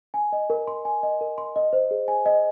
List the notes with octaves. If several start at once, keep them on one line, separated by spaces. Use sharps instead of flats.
G#5
D#5
A#4
C6
G#5
D#5
A#4
C6
D#5
C5
G#4
G#5
D#5